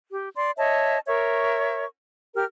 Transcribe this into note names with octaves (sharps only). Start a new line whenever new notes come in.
G4
D5 C6
C#5 D#5 E5 A5
A#4 C#5 E5 C#6
G4 A#4 F6